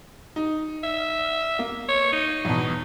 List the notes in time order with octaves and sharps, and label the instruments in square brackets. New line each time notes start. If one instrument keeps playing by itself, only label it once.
[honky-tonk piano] D#4
[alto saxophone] E5
[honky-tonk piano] A#3
[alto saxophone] C#5
D#4
[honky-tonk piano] E2 B2